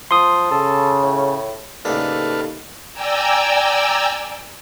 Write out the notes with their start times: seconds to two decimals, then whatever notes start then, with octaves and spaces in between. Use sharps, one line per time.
0.11 F3 C6 D#6
0.51 C#3 A4
1.03 A2
1.85 D#2 A2 C#3 D4 A4 B4 F5
2.93 D5 G5 G#5 A#5 E6